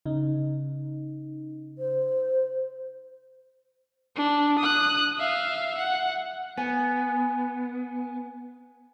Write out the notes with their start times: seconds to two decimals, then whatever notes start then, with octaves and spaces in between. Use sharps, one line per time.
0.06 C#3 D#4
1.79 C5
4.16 D4
4.59 D#6 F#6
5.17 E5 F5
5.78 F#5
6.57 B3 G#5